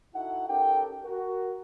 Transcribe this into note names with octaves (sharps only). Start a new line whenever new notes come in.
D#4 E4 F#4 A4 F#5
C#4 D#4 G4 A4 A#4 G5
F#4 A#4